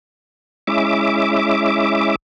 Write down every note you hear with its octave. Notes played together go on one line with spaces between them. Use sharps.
G#3 C#4 E4 E5 D6